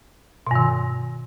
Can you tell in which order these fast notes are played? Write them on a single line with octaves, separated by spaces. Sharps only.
B2 G2 D#3